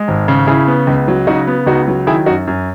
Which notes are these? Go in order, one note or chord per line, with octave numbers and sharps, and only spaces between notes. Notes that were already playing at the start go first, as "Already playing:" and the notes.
Already playing: G#3
G#1
C#3
C#3 E4 G#4
B3
C#2
F#3
C#3 D#4 F#4
B3
C#2 D#4 F#4
F#3
D#3 E4 G#4
F#2 D#4 F#4
F#2